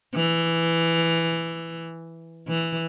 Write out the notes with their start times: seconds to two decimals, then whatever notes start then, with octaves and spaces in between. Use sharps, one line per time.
0.14 E3
2.48 E3